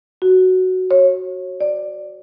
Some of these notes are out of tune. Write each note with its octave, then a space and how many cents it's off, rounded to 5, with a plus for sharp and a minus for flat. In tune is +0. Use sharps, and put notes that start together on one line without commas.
F#4 +5
C#5 -25
D5 +15